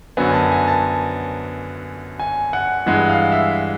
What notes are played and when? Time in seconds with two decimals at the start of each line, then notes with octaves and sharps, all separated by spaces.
0.17 F#2 D3 F#3 B3 G#5
0.29 G#5
0.34 A5
0.52 G#5
0.68 A5
2.20 G#5
2.53 F#5
2.86 G2 E3 G#3 F#5
3.09 F5
3.32 E5